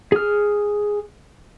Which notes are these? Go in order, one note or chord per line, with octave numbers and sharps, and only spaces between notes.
G#4 F6